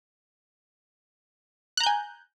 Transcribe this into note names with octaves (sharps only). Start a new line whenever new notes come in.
G#5 A#5 F#6 G6